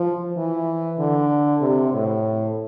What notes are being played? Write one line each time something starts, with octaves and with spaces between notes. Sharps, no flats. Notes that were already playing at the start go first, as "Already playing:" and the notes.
Already playing: F3
E3
D3
C3
A2